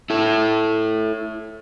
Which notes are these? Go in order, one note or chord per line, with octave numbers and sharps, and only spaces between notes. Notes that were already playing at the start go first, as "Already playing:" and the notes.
E4 A4